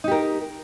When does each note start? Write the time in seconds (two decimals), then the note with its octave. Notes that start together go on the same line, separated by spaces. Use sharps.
0.04 D#4
0.08 G4
0.12 A#4